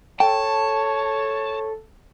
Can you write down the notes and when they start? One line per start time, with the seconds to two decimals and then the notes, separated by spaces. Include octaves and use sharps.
0.20 A4 C#5 G5 A5